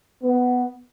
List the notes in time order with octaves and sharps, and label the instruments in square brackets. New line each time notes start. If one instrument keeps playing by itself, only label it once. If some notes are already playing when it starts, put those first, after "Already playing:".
[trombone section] B3